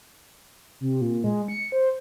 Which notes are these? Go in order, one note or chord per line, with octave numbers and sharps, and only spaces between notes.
C3
A#2
G#3
C#7
C5